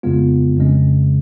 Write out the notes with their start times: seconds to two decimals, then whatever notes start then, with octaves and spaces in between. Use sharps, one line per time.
0.03 F2 C#3 G#3 B3 F4
0.57 F2 C#3 G#3 C#4